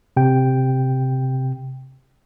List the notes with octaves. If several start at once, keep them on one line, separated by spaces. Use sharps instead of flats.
C3 G5